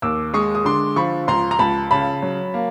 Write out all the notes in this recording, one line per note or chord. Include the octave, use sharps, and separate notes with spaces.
D#2 D6 E6
G#3 C#6 D#6
D#6
D3 C6 D6
F3 B5 C#6
C#2 A#5 C6
A#5
C#2 A5 B5
C#3 A5 B5
F#3
A#3